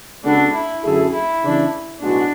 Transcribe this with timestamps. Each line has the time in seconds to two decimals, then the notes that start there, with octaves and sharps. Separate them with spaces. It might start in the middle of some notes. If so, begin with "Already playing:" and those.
0.24 C#3 G#3 B3 D4 F#4 A4
0.54 E4
0.84 F#2 D3 A3 E4 G#4 A4
1.13 E4
1.42 C#3 E3 A3 D4
2.00 B1 A2 G#3 B3 D4 F#4